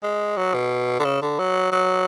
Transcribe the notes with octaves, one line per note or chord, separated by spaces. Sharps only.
G#3
F#3
B2
D3
C#3
D3
F#3
F#3